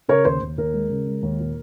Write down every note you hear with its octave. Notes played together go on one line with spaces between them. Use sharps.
C#3 A#4 C#5
D#2 C5
D#2
D#2 A#4
G#3
C#3
G#3
D#2
A#2